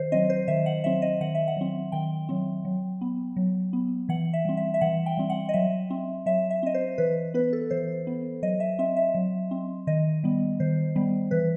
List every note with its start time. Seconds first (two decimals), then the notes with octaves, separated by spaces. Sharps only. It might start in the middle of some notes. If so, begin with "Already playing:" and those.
Already playing: D#3 C5
0.12 F#3 C4 D#5
0.30 C5
0.48 D#3 E5
0.66 F#5
0.84 F#3 C4 E5
1.02 D#5
1.21 D#3 F#5
1.35 E5
1.48 F#5
1.57 F#3 C4
1.92 D#3 G5
2.29 F#3 C4
2.65 F#3
3.01 B3
3.36 F#3
3.73 B3
4.09 E3 F#5
4.33 E5
4.45 G3 C4
4.57 E5
4.74 E5
4.81 E3 F#5
5.06 G5
5.17 G3 C4
5.30 F#5
5.49 D#5
5.53 F#3 E5
5.90 C4
6.26 F#3 E5
6.50 E5
6.63 C4 D#5
6.74 C5
6.98 E3 B4
7.34 B3 B4
7.53 A4
7.71 E3 C5
8.07 B3
8.43 F#3 D#5
8.60 E5
8.79 C4 E5
8.97 E5
9.15 F#3
9.51 C4
9.87 D#3 D#5
10.24 G3 B3
10.60 D#3 C5
10.96 G3 B3
11.31 E3 B4